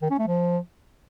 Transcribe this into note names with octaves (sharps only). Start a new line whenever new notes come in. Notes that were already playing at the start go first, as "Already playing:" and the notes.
D#3
C#4
A3
F3